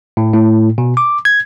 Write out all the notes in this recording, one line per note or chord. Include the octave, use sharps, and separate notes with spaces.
A2
A2
B2
D6
G#6